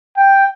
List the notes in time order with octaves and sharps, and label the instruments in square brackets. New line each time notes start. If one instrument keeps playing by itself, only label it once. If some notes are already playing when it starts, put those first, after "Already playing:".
[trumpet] G5